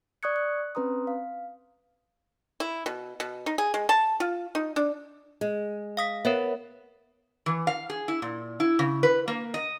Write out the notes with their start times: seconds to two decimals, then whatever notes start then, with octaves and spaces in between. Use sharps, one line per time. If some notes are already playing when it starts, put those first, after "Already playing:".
0.23 D5 C#6 D#6 F#6 G#6 C#7
0.36 F#6
0.75 C4 C#4 B4 A#5 C6 D#6
1.07 F5
2.60 E4
2.86 B2
3.20 B2
3.46 D#4
3.58 G#4
3.74 G#3
3.89 A5
4.20 F4
4.55 D#4
4.76 D4
5.41 G#3
5.97 F5 D#6 B6
6.25 B3 A#4 C#5 E5
7.46 E3
7.67 F5
7.90 G#4
8.08 E4
8.22 A#2
8.60 E4
8.79 C#3
9.03 B4
9.28 A#3
9.54 D#5